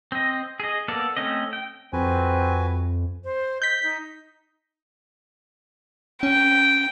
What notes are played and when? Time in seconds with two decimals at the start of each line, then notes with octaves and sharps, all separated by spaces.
0.12 C4 D#5
0.60 G#4 D#5
0.88 A#3 B3 A4 D5
1.17 A3 C4 C#4 D#5
1.53 G5
1.93 F2 C4 F#4 B4 G#5
3.24 C5
3.62 D#5 G6 B6
3.83 D#4
6.23 C#4 G5